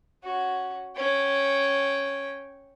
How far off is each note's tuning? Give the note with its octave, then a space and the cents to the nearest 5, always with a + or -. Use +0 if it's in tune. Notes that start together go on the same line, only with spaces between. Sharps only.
C#4 +0 F#4 +0
C#4 -5 G5 -10